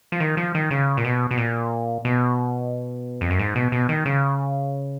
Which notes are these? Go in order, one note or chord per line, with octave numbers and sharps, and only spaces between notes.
F3
D#3
F3
D#3
C#3
A#2
B2
B2
A#2
B2
F2
F#2
G#2
B2
B2
D#3
C#3